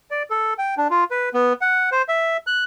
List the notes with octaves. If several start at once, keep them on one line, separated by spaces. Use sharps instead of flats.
D5
A4
G5
D4
F4
B4
B3
F#5
C5
E5
F#6